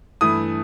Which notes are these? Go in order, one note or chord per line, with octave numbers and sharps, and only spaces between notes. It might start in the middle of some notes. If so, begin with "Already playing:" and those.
G2 E3 A3 D#6